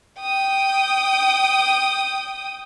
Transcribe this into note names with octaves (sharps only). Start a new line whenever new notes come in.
G5 D#6